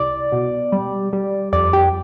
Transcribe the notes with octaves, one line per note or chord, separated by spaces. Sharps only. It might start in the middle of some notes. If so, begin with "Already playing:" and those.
Already playing: C2 D5
B2
G3
G3
F2 D5
G4